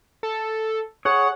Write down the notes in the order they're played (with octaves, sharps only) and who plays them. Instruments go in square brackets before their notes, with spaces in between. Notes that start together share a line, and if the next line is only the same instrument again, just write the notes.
[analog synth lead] A4
[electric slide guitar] G#4 C#5 [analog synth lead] F#5